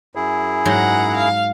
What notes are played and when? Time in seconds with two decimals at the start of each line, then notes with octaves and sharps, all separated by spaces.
0.15 F#2 E4 G#4
0.65 G#2 F#3 F#5 A#5 C6
1.17 F5